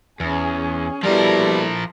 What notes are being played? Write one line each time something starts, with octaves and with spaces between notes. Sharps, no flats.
E2 C#4 G#4
B2 F3 G3 E4 A4 A#4